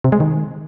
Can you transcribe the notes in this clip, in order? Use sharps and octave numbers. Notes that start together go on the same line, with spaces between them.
C3
G#3
D#3